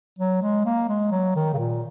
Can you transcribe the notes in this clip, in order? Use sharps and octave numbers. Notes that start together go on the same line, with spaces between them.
F#3
G#3
A#3
G#3
F#3
D#3
C#3
A#2